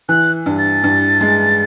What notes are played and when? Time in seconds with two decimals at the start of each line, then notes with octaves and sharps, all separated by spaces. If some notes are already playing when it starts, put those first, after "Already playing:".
0.09 E3 F#6
0.46 G2
0.59 A6
0.83 G2
1.21 G#3